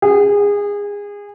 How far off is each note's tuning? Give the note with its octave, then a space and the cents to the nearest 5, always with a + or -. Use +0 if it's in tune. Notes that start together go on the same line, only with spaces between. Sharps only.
G#4 -25